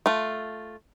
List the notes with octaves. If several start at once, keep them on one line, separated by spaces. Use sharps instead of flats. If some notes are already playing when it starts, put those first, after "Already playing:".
A3 F4